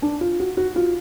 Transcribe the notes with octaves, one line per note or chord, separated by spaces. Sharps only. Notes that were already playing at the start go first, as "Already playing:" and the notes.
D4
F4
F#4
F#4
F4